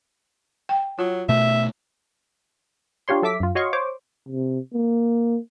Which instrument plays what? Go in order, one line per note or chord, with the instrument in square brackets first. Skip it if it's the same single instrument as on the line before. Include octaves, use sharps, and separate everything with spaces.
[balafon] G5
[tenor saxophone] F#3 [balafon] F4
[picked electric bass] B2 A3 [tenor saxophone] E5
[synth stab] D4 F4 G4 C#5 C6
F#3 A4 E5 D6 B6
F#2 F4
F#4 C#5 D#5 F5 C6 C#6
C5 C#5 D6
[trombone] C3
A#3